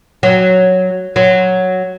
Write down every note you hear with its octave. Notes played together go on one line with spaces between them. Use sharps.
F#3
F#3